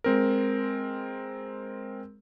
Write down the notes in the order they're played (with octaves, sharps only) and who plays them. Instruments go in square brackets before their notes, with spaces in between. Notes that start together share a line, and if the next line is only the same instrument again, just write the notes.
[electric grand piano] G#3 C4 A#4